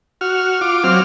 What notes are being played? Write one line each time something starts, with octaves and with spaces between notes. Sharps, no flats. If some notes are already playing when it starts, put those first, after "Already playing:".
F#4 F6
F4 D6
F#3 C4 F5 F6